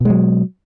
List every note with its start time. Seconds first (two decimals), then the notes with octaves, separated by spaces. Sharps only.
0.01 B2
0.05 G#3
0.10 F#3